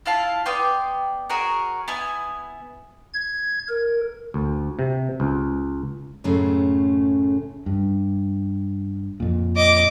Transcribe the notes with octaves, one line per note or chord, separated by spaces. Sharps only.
E4 F4 F5 A5
B3 D5 G5 C6
F#4 G#4 A#4 C#5
B3 E4 G#5
G#6
A#4
D2
C3
C#2
F#2 A2 C#3 G#3 A3
G2
F2 A#2
D#5 D6